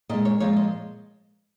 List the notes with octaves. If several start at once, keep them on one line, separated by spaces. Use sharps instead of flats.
A#2 G#3 D#5
C#5
A#2 F3 G#3 C#5
D#5